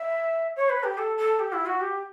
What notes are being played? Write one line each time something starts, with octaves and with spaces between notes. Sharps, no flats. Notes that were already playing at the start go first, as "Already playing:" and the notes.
Already playing: E5
C#5
B4
G4
A4
A4
G4
E4
F#4
G4